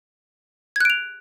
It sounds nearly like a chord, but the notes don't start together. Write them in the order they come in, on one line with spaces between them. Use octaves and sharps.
G#6 F#6 D7 F7